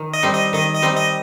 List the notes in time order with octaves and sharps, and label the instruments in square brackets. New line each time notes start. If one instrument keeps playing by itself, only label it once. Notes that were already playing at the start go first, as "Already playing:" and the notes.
Already playing: [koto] D#3
[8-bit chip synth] D#5
[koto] G3 C4 D#4
[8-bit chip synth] D#5
[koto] D#3 [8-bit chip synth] D#5
[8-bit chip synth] D#5
[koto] G3 C4 D#4
[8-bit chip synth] D#5